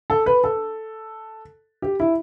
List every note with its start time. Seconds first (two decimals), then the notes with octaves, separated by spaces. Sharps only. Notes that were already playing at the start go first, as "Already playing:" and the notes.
0.10 A4
0.26 B4
0.44 A4
1.82 G4
2.00 E4